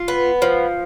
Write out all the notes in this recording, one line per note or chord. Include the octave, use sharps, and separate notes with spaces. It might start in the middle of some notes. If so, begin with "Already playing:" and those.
Already playing: F4
B3
F3